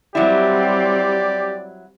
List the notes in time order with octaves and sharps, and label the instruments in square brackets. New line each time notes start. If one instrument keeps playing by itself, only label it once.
[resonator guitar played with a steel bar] F#3 E4 [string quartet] G3 C4 [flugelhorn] G4 [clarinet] D5